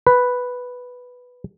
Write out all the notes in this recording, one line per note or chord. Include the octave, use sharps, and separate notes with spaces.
B4